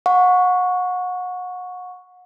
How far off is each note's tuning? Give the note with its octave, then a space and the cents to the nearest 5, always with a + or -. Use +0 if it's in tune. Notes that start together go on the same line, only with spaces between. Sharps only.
F#5 -30 C#6 +0